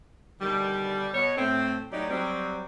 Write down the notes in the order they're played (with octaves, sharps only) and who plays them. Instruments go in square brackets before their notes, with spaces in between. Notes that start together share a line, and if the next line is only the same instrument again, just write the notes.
[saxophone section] B2 D3 D#3 G3
B2 C#5
A2 C4
A2 F#3 D#4 G4 C#5 D5
F#3 G3 C4